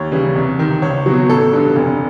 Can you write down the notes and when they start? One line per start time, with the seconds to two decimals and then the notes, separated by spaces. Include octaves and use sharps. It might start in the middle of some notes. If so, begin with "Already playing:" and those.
Already playing: D#2 C#5
0.12 C#3 E3 G3
0.35 C2
0.59 C3 D#3
0.82 C#2 C#5
1.06 B2 F#3
1.29 A1 A4
1.53 G2 D3
1.76 F1